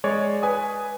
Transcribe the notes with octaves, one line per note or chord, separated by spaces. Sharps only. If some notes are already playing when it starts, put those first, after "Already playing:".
G#3 C#5 D5
B4 G#5 D#6